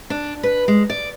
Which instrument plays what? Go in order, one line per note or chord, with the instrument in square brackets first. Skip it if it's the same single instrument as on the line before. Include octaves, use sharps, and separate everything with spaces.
[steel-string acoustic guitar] D4
B4
G#3
D5